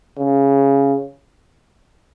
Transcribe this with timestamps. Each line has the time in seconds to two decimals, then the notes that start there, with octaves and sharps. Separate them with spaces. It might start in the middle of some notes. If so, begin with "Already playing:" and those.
0.19 C#3